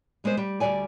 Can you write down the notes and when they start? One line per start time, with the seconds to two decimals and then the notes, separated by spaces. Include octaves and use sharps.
0.24 G3 G#3 B3 C5
0.37 G3
0.60 D2 G2 G3 D5 G#5